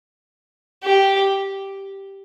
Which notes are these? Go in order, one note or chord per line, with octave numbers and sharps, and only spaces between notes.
G4